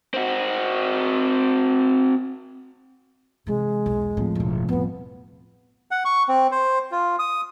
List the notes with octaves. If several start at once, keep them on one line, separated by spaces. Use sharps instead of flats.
C4 F#4
C3 E3 G#3
B1 E2
D2 A2 F3 C4
E1 C#3
F2 G3 B3
F#5
C#6
C4
C5
F4
D#6